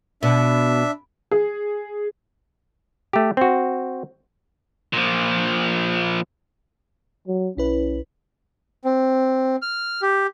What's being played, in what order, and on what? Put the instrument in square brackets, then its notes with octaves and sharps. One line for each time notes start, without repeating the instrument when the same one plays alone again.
[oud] B2 [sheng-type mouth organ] D4 E5
[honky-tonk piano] G#4
[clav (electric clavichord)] A3 G4
C4 F#4
[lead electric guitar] A#2 F3
[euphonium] F#3
[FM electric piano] B1 E4 B4 [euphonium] C#4
[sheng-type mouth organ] C4
F6
G4